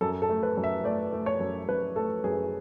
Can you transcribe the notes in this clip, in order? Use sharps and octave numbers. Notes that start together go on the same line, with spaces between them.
F#2 A4
A4
A3
B4
F#2
E5
A3 D5
A3
C#5
F#2
F#2 B4
A3 A4
F#2 G#4